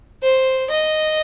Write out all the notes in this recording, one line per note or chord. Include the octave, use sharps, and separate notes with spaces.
C5
D#5